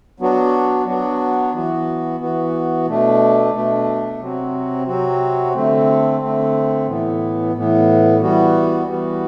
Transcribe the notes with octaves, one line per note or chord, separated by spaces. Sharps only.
F#3 B3 D4 F#4
F#3 B3 D4 F#4
E3 B3 F#4
E3 B3 F#4
B2 A3 D4
B2 A3 D4
C3 F#3 C4 F#4
C3 F#3 C4 F#4
D3 A3 C4
D3 A3 C4
A2 E3 B3
A2 E3 B3
E3 G3 B3 F#4
E3 G3 B3 F#4